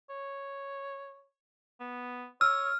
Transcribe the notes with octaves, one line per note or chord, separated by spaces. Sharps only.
C#5
B3
C#5 E6 F6